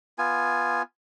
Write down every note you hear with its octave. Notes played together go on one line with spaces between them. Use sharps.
B3 F4 G#5